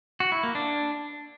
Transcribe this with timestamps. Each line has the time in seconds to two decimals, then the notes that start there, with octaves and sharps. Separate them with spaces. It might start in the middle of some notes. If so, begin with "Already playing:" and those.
0.20 F#4
0.32 E4
0.43 A#3
0.55 D4